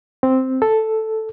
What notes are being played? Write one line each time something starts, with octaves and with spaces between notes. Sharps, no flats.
C4
A4